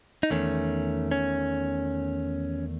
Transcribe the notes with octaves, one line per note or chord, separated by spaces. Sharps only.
D#4
E2 D#3 A3 C#4
C#4